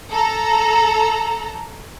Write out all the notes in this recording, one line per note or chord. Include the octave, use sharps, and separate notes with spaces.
A4 A#5